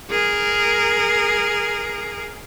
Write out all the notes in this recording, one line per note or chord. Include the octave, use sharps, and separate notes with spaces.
G#4 A#4